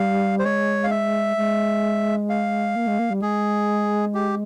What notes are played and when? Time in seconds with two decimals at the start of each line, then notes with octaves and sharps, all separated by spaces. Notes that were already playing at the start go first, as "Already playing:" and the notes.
Already playing: G3 F5
0.39 C5
0.44 G#3 C#5
0.84 F5
0.91 E5
1.37 G#3
2.30 F5
2.76 A#3
2.87 G#3
2.99 A#3
3.10 G3
3.22 G#3 G#4
4.14 G4